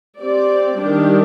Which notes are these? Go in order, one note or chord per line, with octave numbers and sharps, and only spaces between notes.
C4 G4 D5
D#3 G3 D4 G4